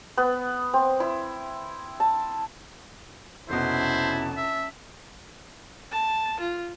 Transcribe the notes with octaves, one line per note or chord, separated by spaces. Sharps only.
B3
C4
E4
A5
F1 B2 C#4 E4 C5 A5
E5
A5
F4